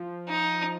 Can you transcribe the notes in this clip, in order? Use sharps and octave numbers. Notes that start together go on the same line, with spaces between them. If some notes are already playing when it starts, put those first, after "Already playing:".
Already playing: F3
D#4